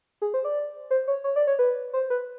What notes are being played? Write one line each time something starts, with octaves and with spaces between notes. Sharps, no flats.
G#4
C5
D5
C5
C#5
C#5
D5
C#5
B4
C5
B4